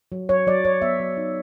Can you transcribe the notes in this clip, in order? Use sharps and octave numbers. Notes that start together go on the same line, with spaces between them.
F#3
F#3 C#5
F#3 D5
F#3 C#5
B3 E5
F#3
D#4